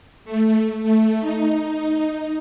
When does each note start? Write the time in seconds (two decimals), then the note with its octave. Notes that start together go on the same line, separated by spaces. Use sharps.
0.25 A3
0.83 A3
1.20 D#4